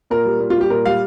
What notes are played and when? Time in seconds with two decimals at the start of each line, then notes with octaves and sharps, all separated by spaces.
0.10 A#2 A#4
0.25 G3
0.40 A#2
0.50 F4
0.56 G3 G4
0.70 A#2 A#4
0.85 G3 F5